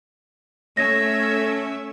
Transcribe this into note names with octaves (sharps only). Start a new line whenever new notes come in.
A3 C#4 C#5 E5 A#6